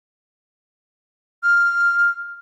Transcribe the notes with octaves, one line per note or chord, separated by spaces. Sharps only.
F6